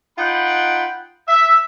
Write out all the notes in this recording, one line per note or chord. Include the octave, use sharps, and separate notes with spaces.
D#4 F4 F#5 G5 B5
E5